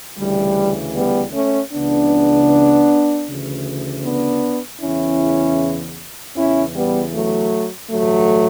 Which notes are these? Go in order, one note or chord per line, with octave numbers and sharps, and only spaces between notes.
D2 C#3 E3 G3
G3 B3
A3 C#4
C#2 C#3 E3 B3 D4
D2 C#3 E3
B3 D4
E2 C#3 E3 C#4 E4
E2 C#3 E3 C#4 E4
G3 B3
F#3 A3
A1 G2 D3 F#3 A3